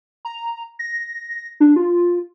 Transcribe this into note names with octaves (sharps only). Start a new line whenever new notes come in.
A#5
A#6
D4
F4